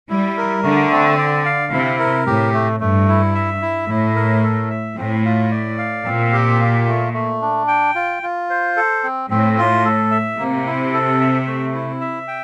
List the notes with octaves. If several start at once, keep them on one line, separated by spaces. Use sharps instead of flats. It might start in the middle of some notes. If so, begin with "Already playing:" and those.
G3 E4
A#4
D3 A3
C4
D5
F5
C3 E4
A#4
A2 G4
A3
G2 A3
E4
E5
E4
A2 E4
A#4
A4
E5
A2 C4
F4
D5
F5
A#2 C4
G4
F4
A3
A3
D4
G5
F4
F4
C5
A4
C4
A2 C4
F4
A4
E5
C3 A#3
E4
A4
E5
A3
E4
E5
G5